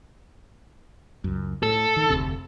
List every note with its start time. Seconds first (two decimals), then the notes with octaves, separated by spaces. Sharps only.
1.24 C#2 F#2
1.63 A2 A4
1.96 D#3
2.10 F1 D2 C3